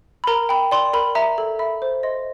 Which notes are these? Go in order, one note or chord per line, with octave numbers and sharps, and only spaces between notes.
B5
A#4 A#5
G5 B5
D5 C6
A#4 B5
E5 A#5
A4
E5 B5
C5
D#5 C6